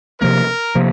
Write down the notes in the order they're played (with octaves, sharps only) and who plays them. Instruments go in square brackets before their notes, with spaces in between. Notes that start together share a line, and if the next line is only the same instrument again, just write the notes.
[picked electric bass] C3 F3 A#3 [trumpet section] A#4
[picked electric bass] C3 F3 A#3